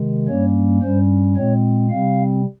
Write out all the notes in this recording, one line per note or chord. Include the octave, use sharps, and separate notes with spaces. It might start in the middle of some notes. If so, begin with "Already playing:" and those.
Already playing: C3 D#3 G#3
G2 G3 A#3 C#4 C#5
G2 G3 C#4 C5
A#2 G#3 C4 C#5
C3 G3 C4 F5